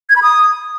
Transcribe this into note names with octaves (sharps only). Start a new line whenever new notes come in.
G#6
B5
D#6